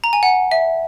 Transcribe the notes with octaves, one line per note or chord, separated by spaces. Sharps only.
A#5
G#5
F#5
E5